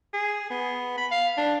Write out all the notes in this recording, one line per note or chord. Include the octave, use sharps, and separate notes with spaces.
G#4
B3
B5
F5
D4